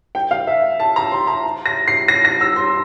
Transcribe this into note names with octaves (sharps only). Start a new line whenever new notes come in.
G5
F5
E5
A5
A#5
C6
A#5
A#6
C7
A#6
A#6
E6
C6